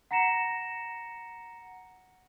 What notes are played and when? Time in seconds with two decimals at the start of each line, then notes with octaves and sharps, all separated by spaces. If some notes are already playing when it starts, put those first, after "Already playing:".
0.11 F#5 A#5 A#6 C#7 E7